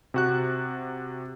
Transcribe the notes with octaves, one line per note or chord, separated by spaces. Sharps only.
C3 F#4 F#6